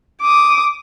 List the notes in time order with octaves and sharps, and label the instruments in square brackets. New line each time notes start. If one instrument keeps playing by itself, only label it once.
[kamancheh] D6 D#6